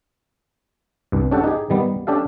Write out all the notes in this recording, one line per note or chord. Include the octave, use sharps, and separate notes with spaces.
C2 G2
C#4 D4 G4 A4 F#5
D#4 G4 G#4
D#3 G3 B3
C#4 D4 G4 A4 F5